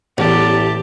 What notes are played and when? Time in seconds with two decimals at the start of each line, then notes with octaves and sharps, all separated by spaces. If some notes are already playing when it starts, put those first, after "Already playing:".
0.18 A1 E2 G4 A5